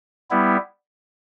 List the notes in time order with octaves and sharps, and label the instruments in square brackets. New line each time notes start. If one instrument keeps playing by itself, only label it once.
[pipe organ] G3 B3 E4